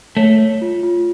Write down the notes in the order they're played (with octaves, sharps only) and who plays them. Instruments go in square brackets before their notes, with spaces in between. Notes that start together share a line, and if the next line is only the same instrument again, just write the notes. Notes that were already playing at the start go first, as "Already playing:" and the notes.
[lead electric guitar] A3 [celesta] C#5
[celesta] C#5
F4
F4